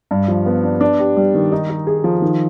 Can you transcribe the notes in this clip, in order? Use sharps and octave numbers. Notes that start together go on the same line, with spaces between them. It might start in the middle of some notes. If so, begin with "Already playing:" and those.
G2
F3
B3
D4
D4
G4
G3
D#3
D#4
D#4
G#4
F3
D#3